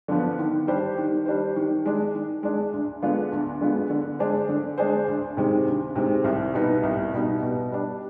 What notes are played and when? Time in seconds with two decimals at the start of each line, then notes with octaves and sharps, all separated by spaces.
0.08 D3 F3 B3
0.39 D#3
0.67 G3 D4 G4 C5
0.97 D#3
1.26 G3 D4 G4 C5
1.56 D#3
1.85 G#3 D4
2.14 D#3
2.43 G#3 D4
2.73 D2
3.02 D3 G#3 B3 F4
3.32 D2
3.61 D3 G#3 B3 F4
3.90 D3
4.19 G#3 D4 G#4 C5
4.49 D3
4.78 G#3 D4 G#4 C5
5.07 D2
5.37 C3 D#3 G#3 C4
5.67 D2
5.96 C3 D#3 G#3 C4
6.24 C2
6.54 B2 G3 B3 D#4
6.83 C2
7.12 B2 G3 B3 D#4
7.42 B2
7.72 G3 D4